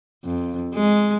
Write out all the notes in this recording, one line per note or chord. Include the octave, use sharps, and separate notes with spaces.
F2
G#3